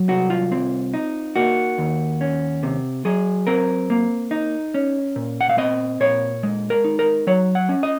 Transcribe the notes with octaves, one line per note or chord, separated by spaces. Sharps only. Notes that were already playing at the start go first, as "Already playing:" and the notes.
Already playing: F#3
C2 F#4
F4
C4
D#4
A#3 F#4
D#2
C#4
C3
F#3 G#4
C4 A#4
A#3
D#4
C#4
A#2
F#5
F5
C4 D#5
A#2 C#5
G#3
A#4
D#4
A#4
F#3 C#5
F#5
C#4
D#5